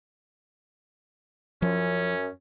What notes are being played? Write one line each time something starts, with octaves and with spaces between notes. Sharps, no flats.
F#2 F3 C#4